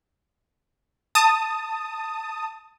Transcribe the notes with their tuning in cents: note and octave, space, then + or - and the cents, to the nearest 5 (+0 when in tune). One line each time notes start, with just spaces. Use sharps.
A5 +20 D#6 +0